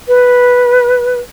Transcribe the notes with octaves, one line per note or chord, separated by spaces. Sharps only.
B4